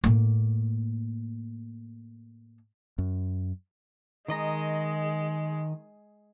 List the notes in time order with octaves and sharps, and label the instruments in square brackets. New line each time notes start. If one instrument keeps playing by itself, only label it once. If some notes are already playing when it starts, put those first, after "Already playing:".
[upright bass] A2 A#3
[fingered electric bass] F#2
[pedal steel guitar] D#3 D#5 A#5 [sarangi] G#3